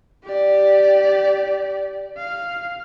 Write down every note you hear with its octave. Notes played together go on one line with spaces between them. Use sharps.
G4 D5
F5